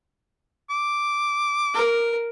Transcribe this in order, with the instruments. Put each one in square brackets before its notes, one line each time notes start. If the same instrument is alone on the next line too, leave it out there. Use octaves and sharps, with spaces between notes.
[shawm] D6
[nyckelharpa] A#4